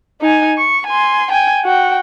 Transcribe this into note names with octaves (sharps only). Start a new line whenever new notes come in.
D#4 G#5
C#6
G#5 C6
G5 G#5
F#4 G5